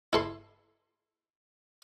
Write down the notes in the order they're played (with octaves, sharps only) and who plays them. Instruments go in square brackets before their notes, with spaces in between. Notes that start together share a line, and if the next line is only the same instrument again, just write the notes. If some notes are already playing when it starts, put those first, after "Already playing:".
[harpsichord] E4 A4 C6